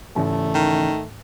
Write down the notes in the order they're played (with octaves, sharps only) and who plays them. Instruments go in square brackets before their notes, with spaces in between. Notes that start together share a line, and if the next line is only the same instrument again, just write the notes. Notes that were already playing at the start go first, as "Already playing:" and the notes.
[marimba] G#2 [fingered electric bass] C#3 E3 C#4 [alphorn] A3
[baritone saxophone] D#3